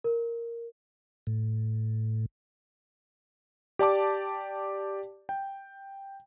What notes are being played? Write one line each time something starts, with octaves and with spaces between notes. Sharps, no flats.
A#4
A2
G4 D5 A5 D6
G5